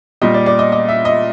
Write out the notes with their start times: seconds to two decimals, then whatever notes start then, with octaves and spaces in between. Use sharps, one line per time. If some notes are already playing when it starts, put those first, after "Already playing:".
0.22 A#2 G3 D#5
0.34 D5
0.46 D5
0.59 D#5
0.72 D#5
0.89 E5
1.05 D#5